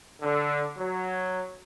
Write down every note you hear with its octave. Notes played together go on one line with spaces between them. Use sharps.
D3
F#3